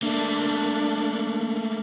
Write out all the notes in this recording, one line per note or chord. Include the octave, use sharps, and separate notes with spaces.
A3 A#3 D4